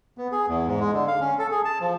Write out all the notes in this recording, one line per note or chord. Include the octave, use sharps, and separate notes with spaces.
B3
G#4
E2
G#2
G#3
D3
F5
C#4
A4
G#4
A5
F3